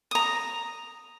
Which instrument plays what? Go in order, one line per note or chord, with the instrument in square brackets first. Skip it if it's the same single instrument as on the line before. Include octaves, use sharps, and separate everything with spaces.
[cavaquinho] A#5 D#6